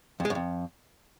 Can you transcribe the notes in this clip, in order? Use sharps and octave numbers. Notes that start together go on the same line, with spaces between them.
F2
G#3
F#2
F2